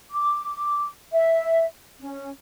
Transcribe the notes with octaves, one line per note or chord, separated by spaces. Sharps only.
D6
E5
C#4